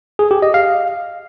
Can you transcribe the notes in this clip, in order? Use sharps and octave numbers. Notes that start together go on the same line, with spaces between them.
G#4
G4
D#5
F5